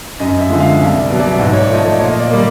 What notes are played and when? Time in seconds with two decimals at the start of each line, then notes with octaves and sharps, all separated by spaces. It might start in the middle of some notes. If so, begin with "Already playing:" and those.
0.20 F#2 D#5
0.39 E5
0.50 D3 F3 G#3
0.60 F5
0.80 C2 E5
1.00 D5
1.10 B2 F#3
1.20 D5
1.32 E5
1.39 G#2 D#5
1.53 C#5
1.60 D5
1.70 F3 A3 D#5
1.80 D5
1.99 A#2 C#5
2.11 D#5
2.20 D5
2.30 G3 A#3